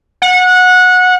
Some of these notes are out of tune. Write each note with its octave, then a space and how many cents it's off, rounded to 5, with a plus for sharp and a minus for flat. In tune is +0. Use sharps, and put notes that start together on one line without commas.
F#5 -20